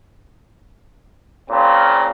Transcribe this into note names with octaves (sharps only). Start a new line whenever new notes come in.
A#2 C#3 C4